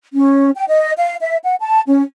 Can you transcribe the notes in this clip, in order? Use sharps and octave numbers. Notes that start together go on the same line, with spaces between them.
C#4
G5
D#5
F5
E5
F#5
A5
C#4